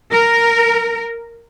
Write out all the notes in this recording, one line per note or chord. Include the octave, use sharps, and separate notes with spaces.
A#4